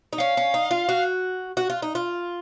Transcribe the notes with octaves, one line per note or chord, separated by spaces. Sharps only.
D#4
C#4 F5
C#4
D#4
F4
F#4
F#4
F4
D#4
F4